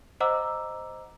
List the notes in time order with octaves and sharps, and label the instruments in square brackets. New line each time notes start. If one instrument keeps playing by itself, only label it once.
[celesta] C5 D#5 F#5 A#5 D6 E6